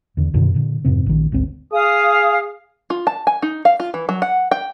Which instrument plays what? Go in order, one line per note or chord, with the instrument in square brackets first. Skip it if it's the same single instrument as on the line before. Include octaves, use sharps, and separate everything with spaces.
[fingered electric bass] E2 D3
F#2 B2 D3 D#3
A#2 D3
F2 G#2 C3 C4
A#1 D#3
G#1 D2 C4
[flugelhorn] G#4 [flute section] F5 D#6
[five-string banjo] F4
A5
G#5
D#4
F5
F4
E3
F#3
F#5
G5